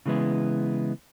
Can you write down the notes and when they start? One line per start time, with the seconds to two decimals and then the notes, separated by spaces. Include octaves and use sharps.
0.06 C#3 E3 G#3 B3 E4